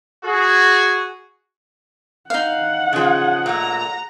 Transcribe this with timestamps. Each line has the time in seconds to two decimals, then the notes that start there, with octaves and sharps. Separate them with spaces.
0.24 F#4 G#4
2.30 D#4 F5 F#5
2.93 C#3 F3 G#4
3.46 A#2 A3 A#5